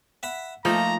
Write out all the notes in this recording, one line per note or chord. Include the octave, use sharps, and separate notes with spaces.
E5 F#5 B5
F3 A3 A#3 D#4 A4 A#5